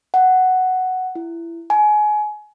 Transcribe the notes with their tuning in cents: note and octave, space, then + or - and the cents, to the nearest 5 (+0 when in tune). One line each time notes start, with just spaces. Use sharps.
F#5 +5
E4 +25
G#5 +25